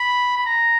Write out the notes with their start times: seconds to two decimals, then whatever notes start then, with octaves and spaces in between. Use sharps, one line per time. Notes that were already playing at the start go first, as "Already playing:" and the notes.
Already playing: B5
0.36 B5
0.46 A#5